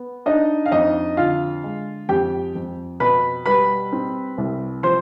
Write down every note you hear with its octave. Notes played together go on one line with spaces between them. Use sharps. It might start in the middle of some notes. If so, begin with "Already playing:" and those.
Already playing: B3
D4 D#4 D#5
F5
F2 D#4 D#5
D3 F4 F5
G#3
F2 G4 G5
F2
B2 B4 B5
G3 B4 B5
C4
C2
F3 C5 C6